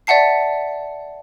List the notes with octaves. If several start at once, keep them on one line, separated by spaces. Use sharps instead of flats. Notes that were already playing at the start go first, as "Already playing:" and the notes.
D5 E5 F#5 A5 C7